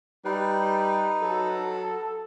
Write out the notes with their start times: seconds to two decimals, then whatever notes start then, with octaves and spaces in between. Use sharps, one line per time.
0.25 G3 D#4 B4
1.22 F#3 A4